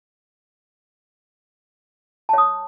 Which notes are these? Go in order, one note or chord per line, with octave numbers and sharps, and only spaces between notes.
C#5 A5 D#6